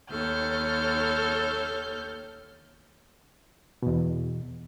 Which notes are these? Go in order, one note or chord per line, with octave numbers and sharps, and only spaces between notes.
D#2 A4 C#5 F6 G6
E2 B2